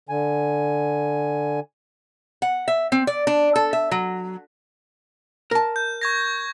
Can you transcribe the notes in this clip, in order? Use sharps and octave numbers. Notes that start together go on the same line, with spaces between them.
D3 G#5
F#5
E5
C4
D5
D4
A4
E5
F#3
A#4 A5
G6
C#6 G#6 A#6